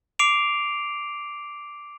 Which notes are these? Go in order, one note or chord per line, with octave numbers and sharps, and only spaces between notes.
D6 C7 D7 F7